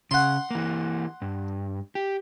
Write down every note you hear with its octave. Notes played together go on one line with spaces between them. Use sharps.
C#3 F#5 C6
E3 A#3
G2
G4